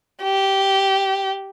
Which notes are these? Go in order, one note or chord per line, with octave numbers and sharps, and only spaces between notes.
G4